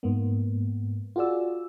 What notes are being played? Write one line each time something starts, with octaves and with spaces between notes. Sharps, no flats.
G#2 A#3 B3
F4 F#4 G#4 D5 E6